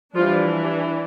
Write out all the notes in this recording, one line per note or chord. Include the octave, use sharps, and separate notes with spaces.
E3 F3 G3 D4 F4